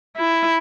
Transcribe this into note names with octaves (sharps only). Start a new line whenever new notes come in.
E4